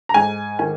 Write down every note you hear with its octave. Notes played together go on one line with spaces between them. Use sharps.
A#5
G#2 G#5
D#3 G#5